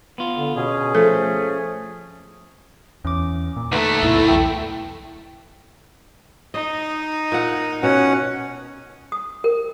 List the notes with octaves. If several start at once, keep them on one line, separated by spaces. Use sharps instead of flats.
B3 F4
D3
B2 C#4 G#4
F3 A3 A4
E2 C#4 D6
A#2
D2 A3 D#4 B4
C#2 F#2 B2 E4 A6
B1 E2 G5
D#4 D#5
A#2 F#5
B2 C#4 F#5
D#6
A#4